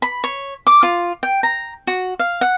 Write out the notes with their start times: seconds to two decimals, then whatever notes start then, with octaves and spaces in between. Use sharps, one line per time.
0.02 B5
0.24 C#5
0.67 D6
0.83 F4
1.23 G5
1.43 A#5
1.87 F#4
2.19 F5
2.41 F#5